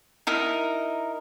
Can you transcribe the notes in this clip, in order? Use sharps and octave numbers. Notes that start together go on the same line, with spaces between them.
D#4 E4 A#4